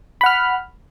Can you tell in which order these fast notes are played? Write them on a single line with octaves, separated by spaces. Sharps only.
B5 F#5 F6